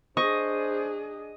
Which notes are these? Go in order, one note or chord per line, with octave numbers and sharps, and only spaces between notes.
D4 G#4 C5 D#5 C#6